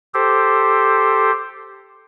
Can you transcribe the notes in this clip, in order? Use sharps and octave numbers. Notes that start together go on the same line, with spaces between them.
G4 A4 C5